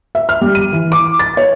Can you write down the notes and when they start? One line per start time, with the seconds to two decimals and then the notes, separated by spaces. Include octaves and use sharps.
0.15 E5
0.29 F6
0.41 G3
0.55 D#7
0.72 E3
0.92 D6
1.19 A6
1.37 C#5